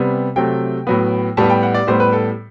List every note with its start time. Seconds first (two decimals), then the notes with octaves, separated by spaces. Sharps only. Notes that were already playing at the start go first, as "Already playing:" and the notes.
Already playing: C3 G3 B3
0.36 C3 F#3 A3 G5
0.87 A2 F#3 B3
1.37 A2 G3 B3 A5
1.50 G5
1.63 F#5
1.74 D5
1.87 A2 G3 B3 C5
2.00 B4
2.13 A4